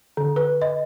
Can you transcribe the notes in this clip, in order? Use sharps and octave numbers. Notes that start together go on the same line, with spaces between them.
D3
B4
D#5